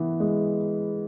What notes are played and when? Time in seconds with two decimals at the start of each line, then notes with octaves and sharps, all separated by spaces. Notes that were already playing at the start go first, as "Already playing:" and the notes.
Already playing: E3 B3
0.20 G#3